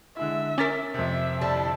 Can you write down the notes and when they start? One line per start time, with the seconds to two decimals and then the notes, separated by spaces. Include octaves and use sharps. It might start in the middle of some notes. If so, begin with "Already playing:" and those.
0.17 D3 G#3 E4 E5
0.58 C#4 A#4 D6 A6 B6
0.94 F2 C3 E5
1.41 D3 G3 E4 A5